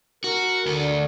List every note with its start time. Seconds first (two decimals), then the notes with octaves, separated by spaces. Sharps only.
0.24 F#4 A#4
0.66 D2 D3 A4